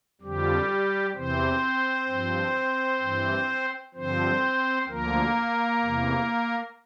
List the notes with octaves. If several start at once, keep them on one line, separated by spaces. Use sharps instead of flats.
F2 D3 F3 G3 G4
E2 C3 E3 C4 C5
G2 F3
G2 E3
G2 D3 F3 C4 C5
D2 D3 F3 A#3 A#4
E2 C3 E3